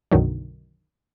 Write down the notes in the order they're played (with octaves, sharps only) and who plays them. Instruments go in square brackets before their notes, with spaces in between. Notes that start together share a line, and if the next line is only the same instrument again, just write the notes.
[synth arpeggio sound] B1 F#2 D3 D#3 F#3